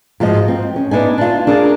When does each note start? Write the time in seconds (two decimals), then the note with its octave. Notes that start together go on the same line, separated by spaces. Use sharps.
0.20 G#2 F3 F#4 D#5
0.48 C4
0.76 C#4
0.91 B3 D4 D#4 G#5
1.18 D4 F4
1.47 D4 G#4 A#4